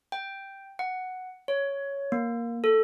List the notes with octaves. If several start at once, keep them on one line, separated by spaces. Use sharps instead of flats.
G5
F#5
C#5
A#3
A4